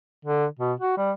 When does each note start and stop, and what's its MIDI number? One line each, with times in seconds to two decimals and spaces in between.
0.25 0.45 50
0.59 0.73 47
0.80 0.96 66
0.97 1.12 55